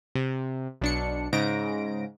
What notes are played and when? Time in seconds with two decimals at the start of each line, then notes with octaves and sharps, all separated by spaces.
0.15 C3
0.82 B1 D4 C#7
1.32 G#2 C#3 A#6 D7